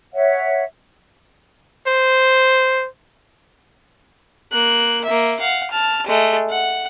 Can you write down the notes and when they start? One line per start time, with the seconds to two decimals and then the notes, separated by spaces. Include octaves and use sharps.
0.13 C#5 E5 F#5
1.87 C5
4.52 A#3 F#6
5.05 A#3 E5
5.39 F5 F#5
5.71 A5 F6
6.07 G#3 A3
6.50 F#5